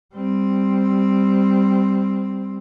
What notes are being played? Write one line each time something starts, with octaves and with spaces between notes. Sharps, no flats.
G3 C4